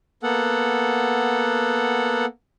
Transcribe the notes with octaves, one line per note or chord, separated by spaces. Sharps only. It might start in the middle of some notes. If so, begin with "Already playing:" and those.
A#3 B3 A4 F#5